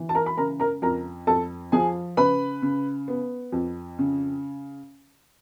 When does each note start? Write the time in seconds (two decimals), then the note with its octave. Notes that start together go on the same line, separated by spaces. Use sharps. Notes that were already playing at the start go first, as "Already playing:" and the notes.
Already playing: E3
0.09 A5
0.15 A#4 A#5
0.26 B5
0.37 C#3 A#4 A#5
0.60 A#4 A#5
0.82 F2 A#4 A#5
1.27 F2 A4 A5
1.72 F3 G#4 G#5
2.17 C#3 B4 B5
2.62 C#3
3.08 B3
3.52 F2
3.99 C#3